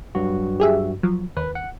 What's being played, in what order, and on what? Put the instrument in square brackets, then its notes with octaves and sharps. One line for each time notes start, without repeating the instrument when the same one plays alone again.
[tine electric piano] G2 F#3 F#4
[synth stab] G4 G#4 E5
F3 F#3
[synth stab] D#2 [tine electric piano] B4
[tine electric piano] F#5